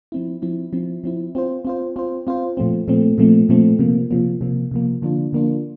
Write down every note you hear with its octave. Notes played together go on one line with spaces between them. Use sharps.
F3 C4 E4
F3 C4 E4
F3 C4 E4
F3 C4 E4
C4 F4 C5
C4 F4 C5
C4 F4 C5
C4 F4 C5
A#2 F3 A3 C4
A#2 F3 A3 C4
A#2 F3 A3 C4
A#2 F3 A3 C4
C3 F3 A#3
C3 F3 A#3
C3 F3 A#3
C3 F3 A#3
D3 F3 A#3 D4 F4
D3 F3 A#3 D4 F4